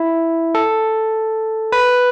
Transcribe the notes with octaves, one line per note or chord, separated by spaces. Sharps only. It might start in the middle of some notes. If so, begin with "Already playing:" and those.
Already playing: E4
A4
B4